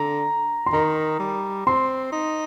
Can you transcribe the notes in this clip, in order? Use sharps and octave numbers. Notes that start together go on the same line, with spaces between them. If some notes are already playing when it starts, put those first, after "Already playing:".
Already playing: D3 A#5
C6
D#3 A#5
G3
C4 C6
D#4